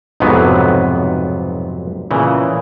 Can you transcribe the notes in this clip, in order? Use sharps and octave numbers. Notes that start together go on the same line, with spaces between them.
B1 F2 G#2 C3 F#3 B3
A#2 C#3 E3